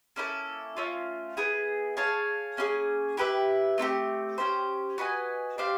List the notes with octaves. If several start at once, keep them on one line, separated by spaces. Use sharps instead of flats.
A#3 C#4 E4 A4
A3 C#4 F4
B3 E4 G#4
G#4 C#5 F5 A5
A#3 C#4 F4 G#4
E4 G4 B4 E5
A3 C4 D#4 G4
C#4 E4 G4 C5
F#4 B4 D#5 G#5
D4 G4 C5 F5